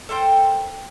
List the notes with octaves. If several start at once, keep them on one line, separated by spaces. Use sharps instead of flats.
A4 A#4 C5 G5